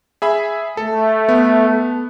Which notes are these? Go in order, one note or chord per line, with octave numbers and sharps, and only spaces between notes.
G#4 E5 B5
A3 A4
B3